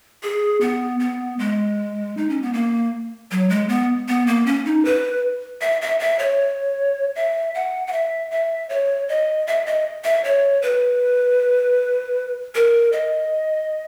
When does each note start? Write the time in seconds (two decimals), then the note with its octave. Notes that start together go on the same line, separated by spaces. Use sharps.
0.23 G#4
0.61 B3
1.00 B3
1.39 G#3
2.17 D#4
2.29 C#4
2.42 B3
2.53 A#3
3.31 F#3
3.49 G#3
3.69 B3
4.08 B3
4.27 A#3
4.46 C#4
4.66 D#4
4.85 B4
5.61 E5
5.82 E5
6.00 E5
6.19 C#5
7.15 E5
7.55 F#5
7.87 F#5
7.93 E5
8.31 E5
8.69 C#5
9.09 D#5
9.47 E5
9.66 D#5
10.04 E5
10.24 C#5
10.62 B4
12.55 A#4
12.92 D#5